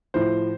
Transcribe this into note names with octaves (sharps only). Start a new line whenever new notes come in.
A2 F3 C5